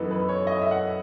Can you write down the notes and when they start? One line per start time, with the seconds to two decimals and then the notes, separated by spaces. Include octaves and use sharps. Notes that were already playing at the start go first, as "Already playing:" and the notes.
Already playing: F#2 E3 B3 D#4 A4 B4
0.11 B4
0.29 C#5
0.47 D#5
0.62 E5
0.71 F#5